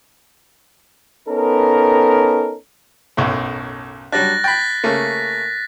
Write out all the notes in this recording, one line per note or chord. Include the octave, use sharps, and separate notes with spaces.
B3 C#4 D#4 A4 A#4
B1 F#2 A2
F#3 G3 D4 F#6 A6 A#6
G5 B5 A6 B6
C#3 A3 A#3